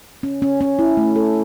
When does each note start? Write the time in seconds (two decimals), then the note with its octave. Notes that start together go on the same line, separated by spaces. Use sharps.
0.23 C#4
0.42 C#4
0.61 C#4
0.79 E4
0.97 A3
1.16 A4